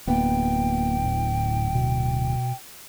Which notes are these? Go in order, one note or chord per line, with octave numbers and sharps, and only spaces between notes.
D1 A#3 B3 G5
A2
B2